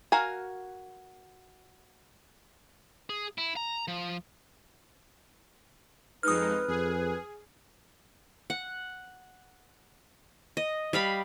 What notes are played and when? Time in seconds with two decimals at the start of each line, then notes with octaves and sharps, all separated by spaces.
0.12 F#4 A#4 F5 G#5
3.09 G#4
3.38 E4
3.56 A#5
3.88 F3
6.23 F2 G#3 D#4 B4 D#6 F6
6.68 F2 G#4
8.50 F#5
10.57 D#5
10.93 G3 F5 B5